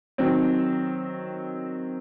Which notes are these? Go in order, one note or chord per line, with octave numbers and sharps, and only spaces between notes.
D#3 F#3 C4